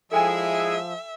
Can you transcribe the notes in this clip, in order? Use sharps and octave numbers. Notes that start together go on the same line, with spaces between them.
F3 G#3 E4 G#4 A4 E5 G5 G#5
E6